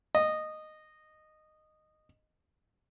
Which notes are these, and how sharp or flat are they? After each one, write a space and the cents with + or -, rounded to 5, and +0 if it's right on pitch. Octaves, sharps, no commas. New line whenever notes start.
D#5 -10